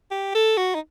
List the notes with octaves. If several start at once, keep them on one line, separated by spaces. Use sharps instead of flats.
G4
A4
F#4
D#4